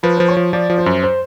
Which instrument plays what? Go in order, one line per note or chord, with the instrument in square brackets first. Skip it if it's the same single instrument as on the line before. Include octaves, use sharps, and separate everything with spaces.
[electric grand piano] F3 [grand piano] B4
[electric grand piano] F3 [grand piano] C5
[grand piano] C#5
[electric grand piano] F3
[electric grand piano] F3 [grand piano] D5
[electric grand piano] F3
[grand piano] C5
[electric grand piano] F#2
[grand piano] C5